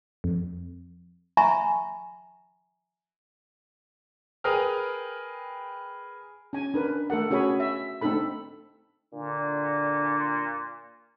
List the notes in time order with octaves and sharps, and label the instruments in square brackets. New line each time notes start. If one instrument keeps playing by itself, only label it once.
[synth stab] F2
[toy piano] E5 G#5 A#5 B5 C#6
[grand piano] G#4 A#4 B4 G5 D#6 F6
[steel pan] C#4 G#5
D4 A#4 B4
A3 A4 A#4 F#5
C#4 F#4 G#4 C#5 G#5 B5
E5
A3 C4 D4 D#4 A4 B5
[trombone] A#2 [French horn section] D3 D4